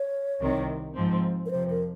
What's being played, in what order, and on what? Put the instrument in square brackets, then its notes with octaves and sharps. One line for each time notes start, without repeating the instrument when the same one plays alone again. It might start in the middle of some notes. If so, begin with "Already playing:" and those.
Already playing: [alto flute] C#5
[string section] C2 C3 D#3
G#2 F3 C4
[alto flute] A#4
[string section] F2 C3 F3 [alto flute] C5
[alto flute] A#4